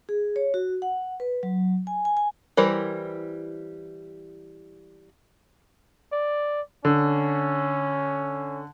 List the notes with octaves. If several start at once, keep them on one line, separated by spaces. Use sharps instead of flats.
G#4
C#5
F#4
F#5
B4
F#3
G#5
G#5
G#5
E3 G3 E4 A#4 C5
D5
D3 C#4